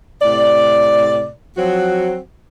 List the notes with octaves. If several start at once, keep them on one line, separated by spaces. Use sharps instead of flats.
A2 C3 D5
F3 F#3 C4 F#4